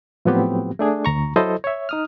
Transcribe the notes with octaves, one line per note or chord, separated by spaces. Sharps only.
A2 F3 F#3 B3 C4 G4
A3 D4 G#4
D2 A#5 C#6
F#3 E4 A4 C5 D#5
C#5 E5
D#4 D#6 F6